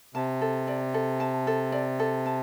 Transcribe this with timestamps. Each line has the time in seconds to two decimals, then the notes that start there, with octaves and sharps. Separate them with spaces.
0.15 C3 A5
0.41 A4
0.67 D5
0.94 A4
1.20 A5
1.47 A4
1.72 D5
2.00 A4
2.26 A5